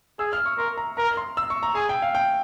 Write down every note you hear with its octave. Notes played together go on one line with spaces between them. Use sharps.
G#4 E6
F6
C#6
A#4 C6
A#5
A#4 A#5
C6
E6
C#6
A#5
G#4 G#5
G5
F5
G5